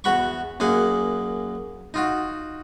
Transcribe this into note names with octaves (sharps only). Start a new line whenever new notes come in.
E2 F#4 F#5 B5 C#6
F#2 A#3 G#4 F#5
D#4 F4 F#4